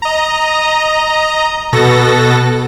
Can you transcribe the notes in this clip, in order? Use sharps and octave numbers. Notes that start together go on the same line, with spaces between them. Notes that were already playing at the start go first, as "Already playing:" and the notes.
D#5 A#5
B2 B3 F#4 A4 A#6